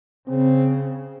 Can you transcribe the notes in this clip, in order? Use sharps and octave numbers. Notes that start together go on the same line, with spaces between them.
C#3 C4